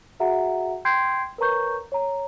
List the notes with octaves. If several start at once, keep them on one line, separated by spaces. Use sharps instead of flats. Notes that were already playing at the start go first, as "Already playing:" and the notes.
F#4 G#4 E5 F#5 A#5
G5 C6 G6 G#6 C7 D7
A#4 B4 C#5 A#5 C#6 G6
C#5 A#5